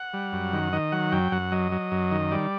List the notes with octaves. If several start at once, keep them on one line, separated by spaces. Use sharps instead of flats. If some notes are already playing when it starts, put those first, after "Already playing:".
Already playing: F#5
G3
F#2
D#3
D#3 D#5
F#3 F#5
F#2 G5
F#2 F#5
F#3 D#5
F#3
F#2
D#3
G3 D5